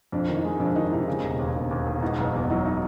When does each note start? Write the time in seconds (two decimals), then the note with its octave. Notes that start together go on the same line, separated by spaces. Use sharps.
0.12 F2 D4
0.28 D#3
0.36 D#4
0.44 G#3
0.60 F2 D4
0.76 D#3 D#4
0.92 C3 D#4
1.07 C#3
1.23 E1
1.39 D#2
1.55 E1
1.71 D#2
1.86 E1
2.02 B2 D#4
2.18 F#1
2.34 E2
2.50 F#3 D#4
2.65 D#4